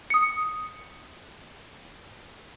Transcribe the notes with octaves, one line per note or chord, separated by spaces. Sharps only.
D#6 C#7